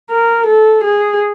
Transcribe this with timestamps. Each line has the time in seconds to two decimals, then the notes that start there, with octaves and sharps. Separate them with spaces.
0.10 A#4
0.47 A4
0.84 G#4